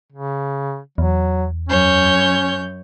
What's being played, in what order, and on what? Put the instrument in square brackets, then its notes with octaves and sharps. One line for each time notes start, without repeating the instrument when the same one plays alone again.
[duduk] C#3
[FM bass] E2 [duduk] F#3
[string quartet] F#2 C#5 G6 [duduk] C#4